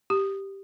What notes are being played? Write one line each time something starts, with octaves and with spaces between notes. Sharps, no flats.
G4